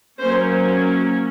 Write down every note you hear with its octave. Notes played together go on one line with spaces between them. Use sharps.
F#3 A#3 C#4 C5